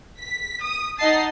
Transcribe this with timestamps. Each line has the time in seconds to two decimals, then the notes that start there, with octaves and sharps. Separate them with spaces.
0.18 B6
0.63 D#6
0.98 D#4 D#5 F#5 A5 A6 C7